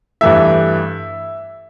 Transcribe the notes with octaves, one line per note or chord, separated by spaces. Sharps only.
G2 E3 A3 E5